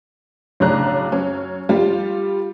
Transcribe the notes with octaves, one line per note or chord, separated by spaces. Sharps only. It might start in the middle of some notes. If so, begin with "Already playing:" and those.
B1 A2 C#3 D4 A#5 F#6
F#2 C#4
G3 F4 G4